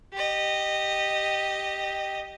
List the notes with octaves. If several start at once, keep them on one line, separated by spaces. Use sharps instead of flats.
G4 D#5